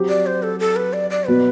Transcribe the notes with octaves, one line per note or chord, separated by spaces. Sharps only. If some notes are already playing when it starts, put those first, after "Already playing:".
Already playing: F#3 C4 G4
D5
C5
A4
A4
B4
D5
D5
B2 F#3 B3 F#4 B4